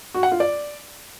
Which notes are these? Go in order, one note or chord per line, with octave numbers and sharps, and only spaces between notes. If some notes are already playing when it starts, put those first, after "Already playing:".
F#4
F#5
F4
D5